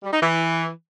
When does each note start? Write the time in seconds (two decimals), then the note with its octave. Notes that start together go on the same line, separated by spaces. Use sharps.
0.03 G3
0.12 D#4
0.21 E3